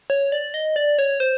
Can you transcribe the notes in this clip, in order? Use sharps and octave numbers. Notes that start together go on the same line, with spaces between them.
C#5
D5
D#5
D5
C#5
C5